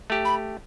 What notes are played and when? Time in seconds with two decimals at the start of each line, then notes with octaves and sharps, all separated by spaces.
0.10 A3 G4
0.25 B5